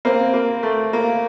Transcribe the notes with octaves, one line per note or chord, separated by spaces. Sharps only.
A#3 C4
A#3
A3
A#3